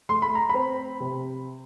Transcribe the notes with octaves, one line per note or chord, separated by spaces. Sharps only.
A3 C6
B5
A#5
C4 B5
C3